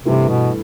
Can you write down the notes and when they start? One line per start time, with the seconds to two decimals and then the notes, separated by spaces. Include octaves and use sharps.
0.05 G2 C3 E3 A3
0.29 B2